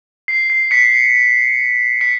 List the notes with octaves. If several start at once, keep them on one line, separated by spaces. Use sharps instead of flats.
C7
C7
B6 C#7
B6 C#7